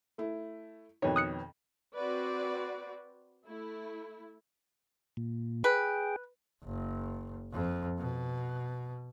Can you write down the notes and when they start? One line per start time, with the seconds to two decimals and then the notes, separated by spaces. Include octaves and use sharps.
0.18 A3 E4
1.02 F2 B2 D#3 B4 C#5
1.16 D#6 F#6 C#7
1.95 C4 F#4 B4 D5
3.46 A3 E4
5.17 A#2
5.64 G#4 B4 G5
6.64 F#1
7.52 F2
7.98 B2